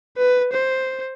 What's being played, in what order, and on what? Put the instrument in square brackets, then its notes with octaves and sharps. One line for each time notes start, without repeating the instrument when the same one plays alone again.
[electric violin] B4
C5